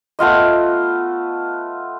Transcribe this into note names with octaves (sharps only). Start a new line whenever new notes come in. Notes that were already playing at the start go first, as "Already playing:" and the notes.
A3 B3 F4 D#5